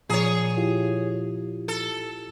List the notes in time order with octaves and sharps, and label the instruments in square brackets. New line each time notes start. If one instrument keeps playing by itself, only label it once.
[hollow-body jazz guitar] A#2 F3 A#5 [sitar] G#4 C#5
[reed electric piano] E4 F4 G4
[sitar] A4